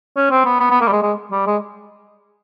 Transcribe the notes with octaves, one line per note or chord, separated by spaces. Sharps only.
C#4
C4
B3
B3
B3
A#3
G3
G#3
G#3
G3
G#3